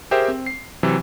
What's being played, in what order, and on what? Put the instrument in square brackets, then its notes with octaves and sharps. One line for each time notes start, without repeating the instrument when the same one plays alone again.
[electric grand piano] G4 G#4 A#4 C5 E5 G5
C4
C7
C3 E3 F#3